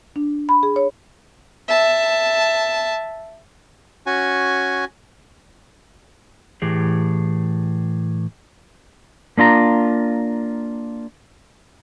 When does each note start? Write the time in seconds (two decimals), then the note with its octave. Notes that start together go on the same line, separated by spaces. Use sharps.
0.16 D4
0.49 B5
0.63 G#4
0.76 C#5
1.68 E5 A5
4.07 C#4 F#4 G#5
6.62 A2 E3 G4 G#4
9.38 A#3 D4 F4 A#5